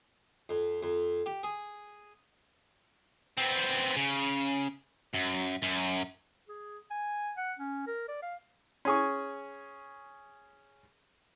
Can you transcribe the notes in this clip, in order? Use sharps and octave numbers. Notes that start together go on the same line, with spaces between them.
F2
F2
G4
G#4
B3 C4
C#3
F#2
F#2
G#4
G#5
F#5
C#4
A#4
D5
F5
C#4 G#4 C#6